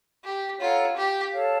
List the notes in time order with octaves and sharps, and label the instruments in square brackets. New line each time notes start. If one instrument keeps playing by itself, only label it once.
[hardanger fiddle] G4
[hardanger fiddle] F4 [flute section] A4 C#5 F#5 A#5
[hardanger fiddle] G4
[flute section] A4 C#5 F5 A5